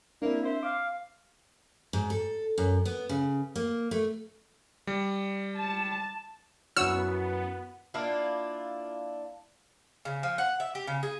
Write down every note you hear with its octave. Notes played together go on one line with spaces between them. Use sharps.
A#3 C4 D4 E4
C5 E5
F5 D6
G#2
A4
F#2
B3
C#3
A#3
A3
G3
A5
F#2 B3 E4 F#4 C#5 E6
A#3 D4 E4 F4
C#3
F3
F#5
E5
G4
C#3
G#4